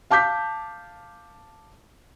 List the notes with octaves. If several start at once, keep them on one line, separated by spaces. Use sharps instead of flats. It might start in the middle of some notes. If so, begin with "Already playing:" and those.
F5 A5 D6 G6 B6